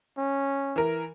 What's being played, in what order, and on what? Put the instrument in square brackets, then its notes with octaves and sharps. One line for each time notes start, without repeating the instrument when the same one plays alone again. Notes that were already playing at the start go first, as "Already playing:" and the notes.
[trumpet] C#4
[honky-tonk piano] E3 A#4